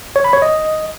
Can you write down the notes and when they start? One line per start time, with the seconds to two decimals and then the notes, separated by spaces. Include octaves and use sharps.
0.16 C#5
0.24 B5
0.33 C#5
0.42 D#5